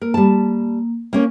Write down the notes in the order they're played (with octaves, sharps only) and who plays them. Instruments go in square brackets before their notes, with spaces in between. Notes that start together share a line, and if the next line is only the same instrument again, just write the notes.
[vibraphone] A#3 [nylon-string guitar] A#4
[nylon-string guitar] G3 A5
A#3 C#4 A#4